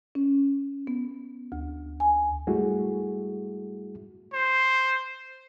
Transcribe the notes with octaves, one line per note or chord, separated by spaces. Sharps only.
C#4
B3
D2
G#5
G#2 G3 A3 E4 F#4 G#4
C5